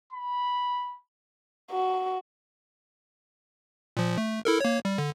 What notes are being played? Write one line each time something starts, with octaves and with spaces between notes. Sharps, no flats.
B5
F#4
A#2 F3
A3
E4 A4 A#4
A#3 C#5
G3
D3